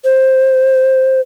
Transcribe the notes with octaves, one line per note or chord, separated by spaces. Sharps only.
C5